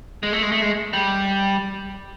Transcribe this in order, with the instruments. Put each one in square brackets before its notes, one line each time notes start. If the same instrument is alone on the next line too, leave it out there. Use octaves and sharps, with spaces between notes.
[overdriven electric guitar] G#3
A3
G#3
A3
G#3
G3